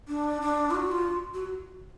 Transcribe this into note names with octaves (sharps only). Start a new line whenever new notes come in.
D4
D4
F4
F#4
F4
F#4